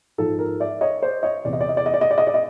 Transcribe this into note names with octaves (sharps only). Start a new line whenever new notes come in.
G#2 F3 A4
A#4
D5 E5
C#5 D#5
C5 D5
C#5 D#5
E2 C3 E3 D5
D#5
D5
D#5
D5
D#5
D5
D#5
D5
D#5
D5
D#5